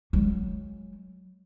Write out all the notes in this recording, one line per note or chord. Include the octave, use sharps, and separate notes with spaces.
F#3 G#3